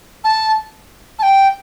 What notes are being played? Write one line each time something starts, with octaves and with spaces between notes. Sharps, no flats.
A5
A5
G5